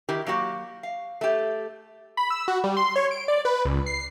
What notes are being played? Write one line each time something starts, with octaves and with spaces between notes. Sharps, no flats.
D#3 E4 G4 A#4
F#3 A#3 F#4 G4
F5
A3 G4
B5
E6
F#4
G3
C6
C#5
D7
D5
B4
C#2
C7